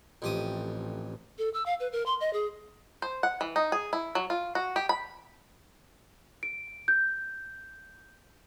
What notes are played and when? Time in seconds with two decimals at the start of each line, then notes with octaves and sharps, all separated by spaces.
0.22 A1 F2 G4 D#6
1.38 A4
1.54 E6
1.66 F5
1.80 B4
1.92 A#4
2.06 C6
2.21 D#5
2.33 G#4
3.02 C5
3.23 F#5
3.41 E3
3.56 D#4
3.72 G#4
3.93 E4
4.15 F#3
4.30 F4
4.55 F#4
4.76 G4
4.89 B5
6.43 D7
6.88 G6